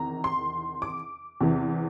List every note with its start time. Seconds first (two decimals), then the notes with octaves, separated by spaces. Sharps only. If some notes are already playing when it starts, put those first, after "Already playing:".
Already playing: E2 C3 D#3 A#5
0.24 C6
0.82 D6
1.41 E2 C3 E3